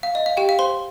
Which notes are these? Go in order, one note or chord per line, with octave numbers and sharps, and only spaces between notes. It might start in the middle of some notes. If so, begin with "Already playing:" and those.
F5
D#5
F5
G4 G5
F5
C5 C6